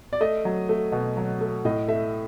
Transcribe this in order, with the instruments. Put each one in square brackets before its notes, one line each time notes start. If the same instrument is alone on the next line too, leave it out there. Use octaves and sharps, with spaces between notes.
[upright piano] D5
A3 D#5
F#3
A3
B2
F#3
A3
A2 D#5
A3 E5